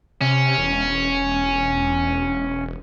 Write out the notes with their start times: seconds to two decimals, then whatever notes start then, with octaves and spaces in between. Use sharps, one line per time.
0.21 C3 C#4
0.58 E1